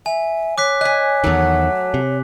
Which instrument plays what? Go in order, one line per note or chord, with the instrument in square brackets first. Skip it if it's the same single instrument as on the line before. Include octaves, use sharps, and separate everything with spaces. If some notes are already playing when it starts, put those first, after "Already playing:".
[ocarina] E5 [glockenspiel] G#5
[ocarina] C#5 [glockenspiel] D6 F#6 B6
[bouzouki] D#5 G#5 [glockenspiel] F#6 B6
[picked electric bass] E2 D#3 [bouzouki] F#3 A3 F#5
[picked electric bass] C3